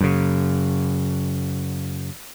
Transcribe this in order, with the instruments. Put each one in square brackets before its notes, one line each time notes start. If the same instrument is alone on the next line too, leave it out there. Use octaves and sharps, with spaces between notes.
[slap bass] F#2 C#3